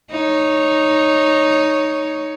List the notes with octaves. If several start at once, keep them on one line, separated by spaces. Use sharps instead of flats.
D#4 C#5